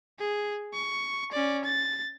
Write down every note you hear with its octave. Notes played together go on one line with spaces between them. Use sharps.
G#4
C#6
C#4 D5
A6